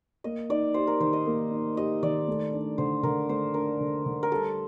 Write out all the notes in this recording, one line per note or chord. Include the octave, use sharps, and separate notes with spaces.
A#3 D#5
D#4 D5
G4 C5
A#4
D#3 C5
D#5
A#3
D#4
G4 D#5
D#3 D5
A3
D4
D3 C5
D3 A#4
A3 C5
D4 A#4
D3
D3
A#4
G3 A4